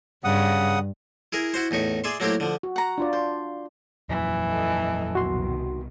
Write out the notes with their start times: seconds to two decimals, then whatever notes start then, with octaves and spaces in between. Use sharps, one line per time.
0.24 G2 C#3 F#5 D#6
1.32 E4 G#4 A#4
1.54 E4 F#4 C5
1.71 E2 A2 D#4 C#6
2.04 G#4 D5 E5 C6
2.20 F#3 A3 A#3 C4 E4 G4
2.40 D3 F3
2.63 F#4
2.76 F#5 A#5
2.98 D4 F4 D5
3.13 C5
4.09 F2 A#2 E3 F#3
4.50 A4 D#5
5.15 C2 B2 D#3 F#4 C6